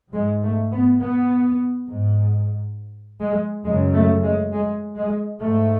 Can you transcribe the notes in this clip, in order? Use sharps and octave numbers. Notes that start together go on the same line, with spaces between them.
G#2 G#3
A3
B3
B3
G#2
G#3
F#2 C#3 G#3
A3
G#3
G#3
G#3
G#2 A3